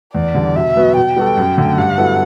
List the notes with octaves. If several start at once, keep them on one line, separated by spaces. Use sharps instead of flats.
E2 D5
D3 G3
B2 E5
F#3 B3 F#4
B2 G5
G3 B3 F#4 A4
F#2
D3 A3
G2 F#5
F#3 B3 E4 A4